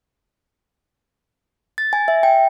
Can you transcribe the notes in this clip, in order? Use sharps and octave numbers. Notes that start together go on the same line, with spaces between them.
A6
G#5
E5
G5